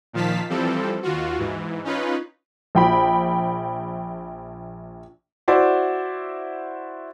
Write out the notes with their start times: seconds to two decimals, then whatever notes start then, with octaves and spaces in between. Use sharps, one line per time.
0.13 A#2 D#3 F3 F5 A5 B6
0.50 E3 F3 G3 C4 A4
1.02 D#2 F4 F#4
1.39 G#2 E3
1.84 C#4 D#4 F4 B4
2.75 A#1 G5 B5
5.48 E4 F#4 C5 D5 E5